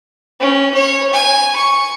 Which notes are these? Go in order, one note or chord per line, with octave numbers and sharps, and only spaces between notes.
C#4
C#5
G#5
C#6